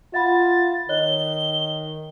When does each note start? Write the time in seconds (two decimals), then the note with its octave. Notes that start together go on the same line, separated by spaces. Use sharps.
0.14 F4 E5 F#5 B5 A6
0.89 D#3 C#5 D#5 F#6 G7